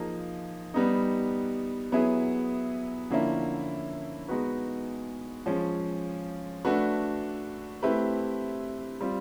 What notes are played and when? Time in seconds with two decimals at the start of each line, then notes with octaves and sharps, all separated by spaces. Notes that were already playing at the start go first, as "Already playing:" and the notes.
Already playing: F3 A#3 D#4 G#4
0.74 G3 B3 D#4
1.92 F#3 B3 E4 G#4
3.10 D3 F3 A#3 C#4 E4
4.28 G#3 B3 D#4 F#4 B4
5.46 F3 G#3 C#4
6.65 A3 D4 F#4 B4
7.83 A3 C4 E4 G4 B4
9.01 G3 C4 F4